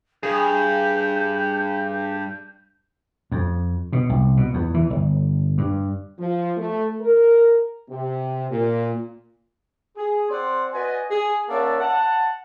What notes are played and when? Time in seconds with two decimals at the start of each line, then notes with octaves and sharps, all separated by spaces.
0.23 G2 G#4 G6
3.32 F2
3.93 B2
4.09 C2
4.37 B2
4.54 E2
4.74 E3
4.90 G1
5.58 G2
6.19 F3
6.57 A3
7.01 A#4
7.89 C3
8.50 A#2
9.97 G#4
10.30 C4 D5 F#5 C6
10.73 F#4 B4 D5 D#5 G#5
11.11 G#4
11.49 A#3 C#4 D5 E5 F#5 A5
11.80 F#5 A5